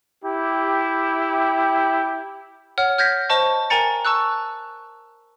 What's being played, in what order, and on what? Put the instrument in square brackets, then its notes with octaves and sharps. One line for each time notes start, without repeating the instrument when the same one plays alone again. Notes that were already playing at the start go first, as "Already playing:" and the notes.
[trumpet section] E4 G4
[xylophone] C#5 F#5 F6
F6 G6 G#6 A#6 B6
C5 D#5 A5 C#6
A#4 G5 G#5 A#5 A6 C#7
A5 C#6 E6 F#6